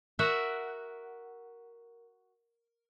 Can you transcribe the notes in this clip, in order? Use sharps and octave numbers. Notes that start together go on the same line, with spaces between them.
F#4 A#4 E5 F#5